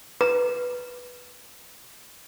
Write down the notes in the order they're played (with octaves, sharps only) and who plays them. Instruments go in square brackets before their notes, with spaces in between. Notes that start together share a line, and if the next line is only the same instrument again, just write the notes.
[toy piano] B4 A#5